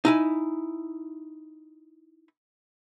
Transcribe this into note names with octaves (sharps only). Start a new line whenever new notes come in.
D#4 E4 G#5